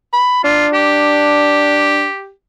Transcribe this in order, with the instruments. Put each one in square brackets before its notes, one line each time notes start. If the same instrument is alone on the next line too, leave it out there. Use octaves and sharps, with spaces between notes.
[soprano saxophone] B5
[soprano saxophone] D4 [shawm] F4
[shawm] G4